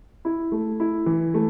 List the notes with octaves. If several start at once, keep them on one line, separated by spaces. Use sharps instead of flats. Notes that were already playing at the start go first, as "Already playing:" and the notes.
E4
A3
E4
E3
A3